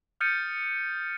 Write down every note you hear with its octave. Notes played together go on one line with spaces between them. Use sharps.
D#6 F6 G6 A6 C#7 D#7